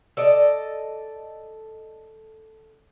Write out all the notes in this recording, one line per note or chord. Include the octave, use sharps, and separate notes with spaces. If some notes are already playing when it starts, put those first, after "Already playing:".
A4 D5 D#5